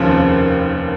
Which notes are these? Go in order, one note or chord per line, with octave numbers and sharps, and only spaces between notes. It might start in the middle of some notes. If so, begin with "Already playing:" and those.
Already playing: F1 D#2 C#3 F3 C4